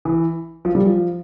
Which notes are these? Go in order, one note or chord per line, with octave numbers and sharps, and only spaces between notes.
E3
F3
G3
F3